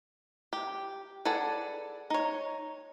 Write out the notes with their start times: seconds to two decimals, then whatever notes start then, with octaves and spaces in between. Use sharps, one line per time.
0.53 G4
1.25 G#4 A4 B4 D5 F#5
2.10 D#4 C#5